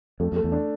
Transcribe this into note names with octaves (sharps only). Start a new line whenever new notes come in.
F2 A3
F2 A3
E2
D4